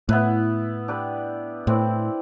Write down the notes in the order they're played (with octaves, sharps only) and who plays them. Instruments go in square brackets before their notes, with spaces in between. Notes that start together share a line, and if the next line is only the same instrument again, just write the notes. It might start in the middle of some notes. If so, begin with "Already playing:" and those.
[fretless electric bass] A2 [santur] B3 E4 B4
[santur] D4 G4 B4 D5
[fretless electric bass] A2 [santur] C4 E4 B4 D5